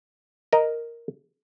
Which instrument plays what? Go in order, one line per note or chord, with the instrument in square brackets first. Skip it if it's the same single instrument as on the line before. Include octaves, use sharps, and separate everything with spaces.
[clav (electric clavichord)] A#4 D#5